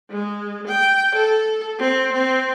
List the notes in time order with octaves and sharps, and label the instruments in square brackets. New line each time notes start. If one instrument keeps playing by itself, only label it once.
[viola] G#3
G5
A4
C4
C4